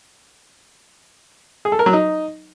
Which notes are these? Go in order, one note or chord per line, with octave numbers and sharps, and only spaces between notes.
G#4
A4
A#4
F#3
D#4